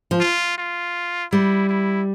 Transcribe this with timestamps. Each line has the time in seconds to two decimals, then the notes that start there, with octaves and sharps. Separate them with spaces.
0.11 F3
0.20 F4
0.58 F4
1.32 G3 E4
1.69 E4